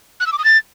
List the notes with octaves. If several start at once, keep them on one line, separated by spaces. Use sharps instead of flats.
F#6
E6
D6
D#6
A6